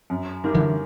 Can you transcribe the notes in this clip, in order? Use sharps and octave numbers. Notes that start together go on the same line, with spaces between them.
F#2
D#3 G3 A#3
D3 E3